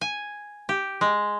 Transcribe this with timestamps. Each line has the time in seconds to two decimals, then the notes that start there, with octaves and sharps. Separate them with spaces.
0.01 G#5
0.69 G4
1.01 G#3